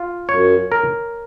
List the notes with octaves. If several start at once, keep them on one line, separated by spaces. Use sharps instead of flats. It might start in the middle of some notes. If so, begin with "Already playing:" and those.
Already playing: F4
F#2 C#5
A#4